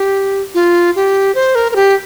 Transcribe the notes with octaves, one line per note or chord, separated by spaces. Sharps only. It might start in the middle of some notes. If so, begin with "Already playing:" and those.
Already playing: G4
F4
G4
C5
A#4
A#4
G4